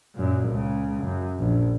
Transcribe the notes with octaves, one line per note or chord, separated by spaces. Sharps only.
F#2 A#2
C#2 C#3
F#2
A#1